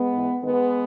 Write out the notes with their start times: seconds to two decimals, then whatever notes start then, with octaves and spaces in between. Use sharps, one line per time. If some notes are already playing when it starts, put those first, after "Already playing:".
Already playing: G#3 B3
0.13 G#2 E3
0.42 G#2 D#3 G#3 B3